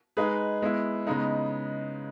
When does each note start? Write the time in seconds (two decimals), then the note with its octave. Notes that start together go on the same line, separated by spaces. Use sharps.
0.17 G#3 D#4 G#4 B4
0.62 G#3 B3 E4
1.07 C#3 G#3 B3 D#4